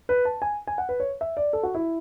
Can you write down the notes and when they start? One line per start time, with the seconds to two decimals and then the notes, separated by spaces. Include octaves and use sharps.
0.09 B4
0.25 A5
0.42 G#5
0.67 G#5
0.78 F#5
0.89 B4
1.00 C#5
1.21 E5
1.37 D5
1.53 A4
1.63 F#4
1.75 E4